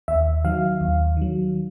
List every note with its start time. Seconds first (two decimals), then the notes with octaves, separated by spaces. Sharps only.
0.08 D#2 E5
0.44 D#3 F#3 F5
0.81 D#2
1.17 D#3 F#3